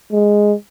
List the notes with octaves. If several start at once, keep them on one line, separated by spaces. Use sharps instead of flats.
G#3